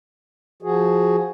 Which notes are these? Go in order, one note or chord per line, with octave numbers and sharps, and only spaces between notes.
F3 F#4 G#4